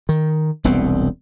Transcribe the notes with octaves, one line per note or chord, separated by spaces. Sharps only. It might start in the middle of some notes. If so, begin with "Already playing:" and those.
D#3
E1 C2 B3 C4